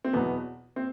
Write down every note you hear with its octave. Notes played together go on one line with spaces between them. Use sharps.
C4
E2 B2 F#3 B3
C4